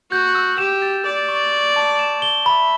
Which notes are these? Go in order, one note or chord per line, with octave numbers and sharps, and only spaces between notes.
F#4 G6
E6
G4 E7
A6
D5 G6
C#6
C#6
A5
E7
G7
E5 B5